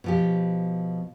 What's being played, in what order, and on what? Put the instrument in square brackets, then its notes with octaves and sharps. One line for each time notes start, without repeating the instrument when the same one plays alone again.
[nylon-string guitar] B2 F3 G4